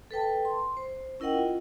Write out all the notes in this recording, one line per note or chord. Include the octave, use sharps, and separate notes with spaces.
A4 B4 G5 A5
C6
C5
C#4 E4 A#4 D#5 F#5 G5
F4